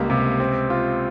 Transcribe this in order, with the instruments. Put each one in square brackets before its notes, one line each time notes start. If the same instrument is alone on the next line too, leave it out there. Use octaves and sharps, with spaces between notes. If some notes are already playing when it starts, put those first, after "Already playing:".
Already playing: [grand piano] C#2 G3 A#3
C3
C4
F4